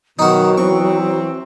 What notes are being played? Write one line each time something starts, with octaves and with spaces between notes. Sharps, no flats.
B2 D#3 F#3 D#4 F#4
E3 C4 C#6